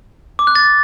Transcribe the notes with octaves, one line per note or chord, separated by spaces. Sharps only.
D6
F#6
A6